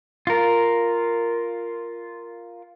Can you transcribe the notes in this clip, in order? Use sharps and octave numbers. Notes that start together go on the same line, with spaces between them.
F4 A#4